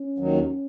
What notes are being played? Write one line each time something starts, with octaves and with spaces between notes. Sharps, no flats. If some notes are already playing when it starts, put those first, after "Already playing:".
Already playing: C#4
D#2 D#3 F#3